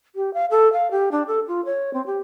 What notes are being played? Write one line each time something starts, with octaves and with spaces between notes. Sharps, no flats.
G4
F5
A4
F5
G4
D4
A4
F4
C#5
C4
G4